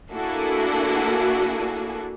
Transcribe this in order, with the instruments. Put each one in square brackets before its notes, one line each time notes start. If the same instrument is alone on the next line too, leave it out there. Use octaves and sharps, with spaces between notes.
[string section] A#3 D4 E4 F#4 G#4 A4